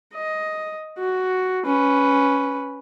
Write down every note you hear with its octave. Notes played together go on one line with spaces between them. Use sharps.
D#5
F#4
C#4 B4